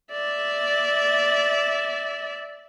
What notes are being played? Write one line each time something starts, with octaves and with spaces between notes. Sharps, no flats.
D5 E5